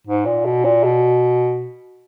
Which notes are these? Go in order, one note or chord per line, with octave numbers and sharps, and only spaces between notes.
G#2
A#2
B2
A#2
B2